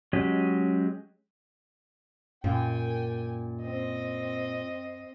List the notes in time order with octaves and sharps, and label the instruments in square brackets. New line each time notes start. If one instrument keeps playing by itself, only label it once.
[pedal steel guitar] F#3 G#3 C#4 G4 D#5
[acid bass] F#2 [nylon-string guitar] A#2 [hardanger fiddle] G5 G#5
[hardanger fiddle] C4 D#5